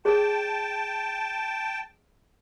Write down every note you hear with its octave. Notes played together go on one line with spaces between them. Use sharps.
G#4 C#5 G5 A5